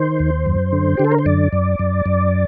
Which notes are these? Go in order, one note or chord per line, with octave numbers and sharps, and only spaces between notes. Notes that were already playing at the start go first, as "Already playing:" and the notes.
Already playing: D#3 C5
D#2
F#2
D3
D3 G4
A4
A#4
C5
F#2 D5
F#2
F#2
F#2